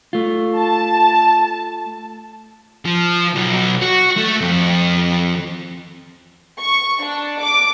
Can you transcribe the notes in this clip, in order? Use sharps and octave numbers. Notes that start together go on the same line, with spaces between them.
A3 F4
A5
F3
B1
F#4
A3
F2
C#6
D4
D6